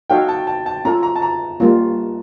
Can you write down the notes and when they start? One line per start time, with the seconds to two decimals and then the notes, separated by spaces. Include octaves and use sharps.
0.10 D#4 F#4 A4 C#5 F5 G5
0.29 A5
0.47 A5
0.66 A5
0.85 C#4 F4 A4 A#5
1.03 A#5
1.16 A5
1.22 A#5
1.60 G3 A#3 C#4 F4